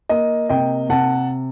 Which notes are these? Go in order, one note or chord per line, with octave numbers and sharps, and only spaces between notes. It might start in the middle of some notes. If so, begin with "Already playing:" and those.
A#3 D#5
C3 D#5 G5
C3 F#5 A5